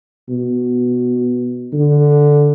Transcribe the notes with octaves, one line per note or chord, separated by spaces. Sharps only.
B2
D3